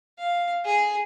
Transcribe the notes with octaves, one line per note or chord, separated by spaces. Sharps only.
F5
G#4